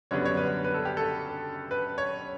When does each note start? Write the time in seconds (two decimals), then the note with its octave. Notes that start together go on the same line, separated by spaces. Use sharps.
0.11 F#2 D3 G3 B3 D4 C#5
0.25 C#5
0.37 B4
0.64 B4
0.74 A4
0.85 G4
0.97 A4
1.71 B4
1.98 C#5